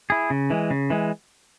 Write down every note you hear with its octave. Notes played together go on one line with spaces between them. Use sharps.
E4 G#4
C#3
E3 G#3
C#3
E3 G#3